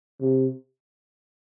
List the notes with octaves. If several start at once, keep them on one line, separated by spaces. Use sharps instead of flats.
C3